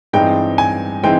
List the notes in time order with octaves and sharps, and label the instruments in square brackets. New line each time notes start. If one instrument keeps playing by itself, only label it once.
[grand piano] G2 E3 G#3 C4 D#4 G5
G#5
E3 G#3 C4 D#4 G5